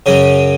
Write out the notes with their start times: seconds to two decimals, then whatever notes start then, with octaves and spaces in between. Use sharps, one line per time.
0.06 F#2 C#3 F#3 C#4